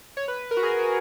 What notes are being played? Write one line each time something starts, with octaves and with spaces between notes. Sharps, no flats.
C#5
B4
B4
A#4
F#4
G#4
F#4